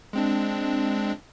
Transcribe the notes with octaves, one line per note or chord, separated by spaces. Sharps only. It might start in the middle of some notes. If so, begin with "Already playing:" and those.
G#3 C4 D4